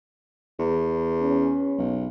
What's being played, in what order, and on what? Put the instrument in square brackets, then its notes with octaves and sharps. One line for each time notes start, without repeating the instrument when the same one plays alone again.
[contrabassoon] E2
[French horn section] C#4
[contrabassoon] B1